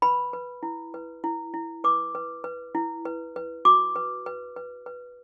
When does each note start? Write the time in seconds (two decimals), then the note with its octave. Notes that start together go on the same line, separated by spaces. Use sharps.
0.02 B4 B5
0.33 B4
0.63 E4
0.94 B4
1.24 E4
1.54 E4
1.84 B4 D6
2.15 B4
2.44 B4
2.75 E4
3.05 B4
3.36 B4
3.65 F#4 D6
3.96 B4
4.26 B4
4.56 B4
4.86 B4